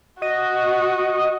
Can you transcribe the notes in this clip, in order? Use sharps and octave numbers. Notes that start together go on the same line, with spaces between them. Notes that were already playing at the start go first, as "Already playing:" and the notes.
F#4 D#5